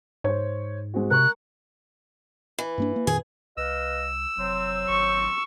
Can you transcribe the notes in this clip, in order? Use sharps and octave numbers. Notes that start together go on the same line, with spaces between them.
G#2 C5 C#5
G#3 C4 F#4
C3 A#4 C#6 F#6
E3
G2 A#3 D4
A#3
F2 A#2 D#3 G#4
C2 B4 D#5 F5 E6
F1 F#3 C4
G#1 C#6